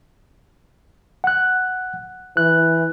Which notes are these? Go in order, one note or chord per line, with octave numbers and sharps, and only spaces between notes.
F#5 F#6
E3 F#6